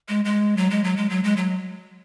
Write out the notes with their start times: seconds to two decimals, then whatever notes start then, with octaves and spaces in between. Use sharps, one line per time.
0.09 G#3
0.25 G#3
0.57 F#3
0.70 G#3
0.84 F#3
0.97 G#3
1.10 F#3
1.24 G#3
1.37 F#3